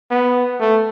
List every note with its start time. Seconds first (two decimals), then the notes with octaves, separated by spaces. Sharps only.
0.11 B3
0.60 A3